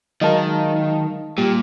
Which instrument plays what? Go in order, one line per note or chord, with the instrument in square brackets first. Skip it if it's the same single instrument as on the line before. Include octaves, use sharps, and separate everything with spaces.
[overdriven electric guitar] D#3 [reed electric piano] F#3 G#3 A#4 [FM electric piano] D#5 F5 A5
[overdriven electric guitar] A#2 [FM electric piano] G3 [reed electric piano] G4